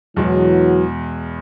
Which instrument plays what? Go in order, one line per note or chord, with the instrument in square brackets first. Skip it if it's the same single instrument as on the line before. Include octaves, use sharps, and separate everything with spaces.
[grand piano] E2 B2 G#3 [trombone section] E3 F#3